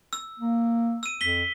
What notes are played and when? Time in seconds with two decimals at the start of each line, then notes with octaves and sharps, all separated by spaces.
0.13 E6
0.40 A#3
1.03 E6 D#7
1.21 F2 B6 G7